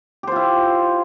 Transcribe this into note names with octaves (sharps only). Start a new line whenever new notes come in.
E4 F4 G4 C5